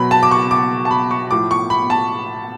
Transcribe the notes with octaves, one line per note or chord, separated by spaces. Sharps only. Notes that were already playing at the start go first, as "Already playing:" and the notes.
Already playing: B2 F#3 B5
A5
D6
C#6
D6
A5
B5
C#6
A2 F3 D6
C#6
B5
A5